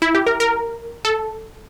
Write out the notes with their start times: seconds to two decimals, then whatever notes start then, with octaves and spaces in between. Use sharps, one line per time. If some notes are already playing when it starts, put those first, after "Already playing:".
0.02 E4
0.15 G4
0.27 A#4
0.40 A#4
1.05 A4